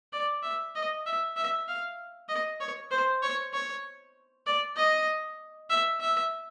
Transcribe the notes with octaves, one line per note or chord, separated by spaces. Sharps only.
D5
E5
D#5
E5
E5
F5
D#5
C#5
C5
C#5
C#5
D5
D#5
E5
E5